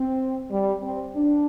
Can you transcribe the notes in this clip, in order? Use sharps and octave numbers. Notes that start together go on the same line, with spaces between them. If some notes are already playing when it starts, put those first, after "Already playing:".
Already playing: C4
G3
C4
D4